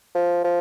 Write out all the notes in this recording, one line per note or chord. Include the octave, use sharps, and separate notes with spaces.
F3
F3